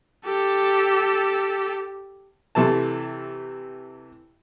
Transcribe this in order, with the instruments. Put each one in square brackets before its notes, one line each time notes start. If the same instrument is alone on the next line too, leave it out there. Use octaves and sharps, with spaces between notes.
[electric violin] G4 A4
[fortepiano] C3 E3 A3 A5